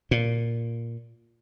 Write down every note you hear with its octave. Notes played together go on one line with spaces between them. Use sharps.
A#2